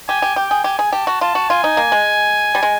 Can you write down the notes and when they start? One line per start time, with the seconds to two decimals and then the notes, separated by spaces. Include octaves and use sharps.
0.09 G4 G#5
0.22 G4
0.36 G4 G5
0.51 G#4
0.64 G4 G#5
0.79 G#4
0.93 G4 A5
1.07 F#4
1.21 F4 A5
1.35 F#4
1.50 F4 G#5
1.64 D#4
1.77 A#3
1.92 G#3
2.55 G3
2.63 G#3